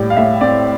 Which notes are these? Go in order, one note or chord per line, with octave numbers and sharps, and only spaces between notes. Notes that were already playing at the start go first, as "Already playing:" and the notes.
Already playing: A2 G3 D5
F5
A2 E5
C4 D5